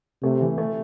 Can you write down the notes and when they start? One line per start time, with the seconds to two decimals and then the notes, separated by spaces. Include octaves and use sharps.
0.23 C3 A3
0.41 E3
0.58 A3